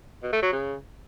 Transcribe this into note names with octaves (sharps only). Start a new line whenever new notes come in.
B2
A3
F#3
C#3